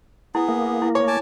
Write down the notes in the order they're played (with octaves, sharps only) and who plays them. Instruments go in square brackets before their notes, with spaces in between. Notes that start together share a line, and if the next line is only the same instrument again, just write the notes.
[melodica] B3 G#4 [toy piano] E4
[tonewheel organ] A#3
[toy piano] E4
[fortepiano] C#5
[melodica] G#5 A5 D6